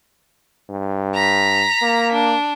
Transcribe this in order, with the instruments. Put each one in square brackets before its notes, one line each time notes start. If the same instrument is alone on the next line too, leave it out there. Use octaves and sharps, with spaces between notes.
[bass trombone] G2
[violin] A#5 B6
[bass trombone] A#3
[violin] D4